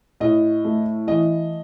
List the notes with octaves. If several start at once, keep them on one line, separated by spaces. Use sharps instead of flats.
A2 D#5
A3
E3 D#5